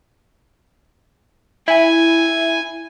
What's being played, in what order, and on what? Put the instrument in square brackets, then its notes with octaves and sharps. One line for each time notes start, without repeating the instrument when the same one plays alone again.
[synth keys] E4 [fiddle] G#5